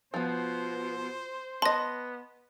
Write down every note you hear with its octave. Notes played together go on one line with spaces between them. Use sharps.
B2 F3 B3 C5
B3 D#5 A5 C6 A#6